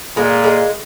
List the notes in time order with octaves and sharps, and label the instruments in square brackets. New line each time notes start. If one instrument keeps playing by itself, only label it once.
[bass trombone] A#2 [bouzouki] G#3
[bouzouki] G#3